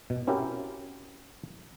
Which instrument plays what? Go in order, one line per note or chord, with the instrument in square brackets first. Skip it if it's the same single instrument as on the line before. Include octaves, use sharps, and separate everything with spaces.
[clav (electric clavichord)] B2
C4 C#4 E4 F#4 G4 A#4